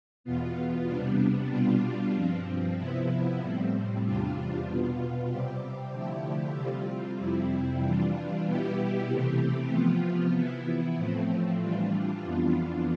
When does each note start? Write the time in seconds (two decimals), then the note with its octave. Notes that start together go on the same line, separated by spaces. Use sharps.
0.24 E2 B2 B3 F4
0.87 C3 G3 B3 D4
1.51 B2 G3 D4 F4
2.13 G2 F3 C4
2.76 C3 F3 B3 E4
3.40 A2 G3 C4
4.04 E2 C3 G3 D4 F4
4.67 B2 B3 F4
5.30 C3 G3 C4 G4
5.92 D3 F3 A3 E4 G4
6.55 C3 G3 C4 F4
7.19 F2 C3 G3 C4 E4
7.82 E3 G3 D4 F4
8.45 B2 G3 B3 E4 G4
9.07 C3 E3 A3 C4 G4
9.71 C3 F3 B3 F4
10.35 E3 B3 E4
10.97 A2 F3 A3 C4
11.61 E3 G3 D4 F4
12.23 F2 E3 B3 D4 F4